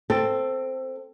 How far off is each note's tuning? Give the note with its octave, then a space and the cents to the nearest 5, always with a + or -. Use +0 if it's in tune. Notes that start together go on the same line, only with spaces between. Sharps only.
C4 +0 A4 +15